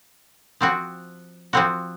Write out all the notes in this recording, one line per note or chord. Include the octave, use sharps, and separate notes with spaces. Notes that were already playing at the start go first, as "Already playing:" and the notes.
F3 C4 F#4
F3 C4 F#4